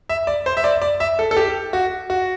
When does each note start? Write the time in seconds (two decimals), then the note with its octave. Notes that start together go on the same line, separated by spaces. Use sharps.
0.09 E5
0.27 D5
0.46 C5
0.57 E5
0.64 D5
0.82 D5
1.00 E5
1.19 A4
1.31 A4
1.37 G4
1.73 F#4
2.10 F#4